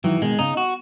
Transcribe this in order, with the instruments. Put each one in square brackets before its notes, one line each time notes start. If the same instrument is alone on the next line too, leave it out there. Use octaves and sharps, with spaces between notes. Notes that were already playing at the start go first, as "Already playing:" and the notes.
[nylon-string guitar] D#3 F#3 [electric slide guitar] E3
[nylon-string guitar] B2 D#3 [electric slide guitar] G#3
[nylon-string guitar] C#3 [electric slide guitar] D#4
[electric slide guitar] F#4